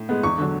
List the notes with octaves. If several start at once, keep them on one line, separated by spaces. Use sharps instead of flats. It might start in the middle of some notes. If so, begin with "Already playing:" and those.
Already playing: A2
G#3 B3
E2 C#6
D3 F#3